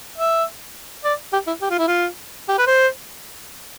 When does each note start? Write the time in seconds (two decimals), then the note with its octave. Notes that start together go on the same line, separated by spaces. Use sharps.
0.18 E5
1.04 D5
1.33 G4
1.47 E4
1.62 G4
1.70 F4
1.79 E4
1.87 F4
2.48 G4
2.58 B4
2.67 C5